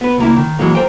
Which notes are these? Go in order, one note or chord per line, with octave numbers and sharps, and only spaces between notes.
B3 B4
C#2 A#3 E4
D#3
E3 F#3 G#3 A#3
A#4 C5 G5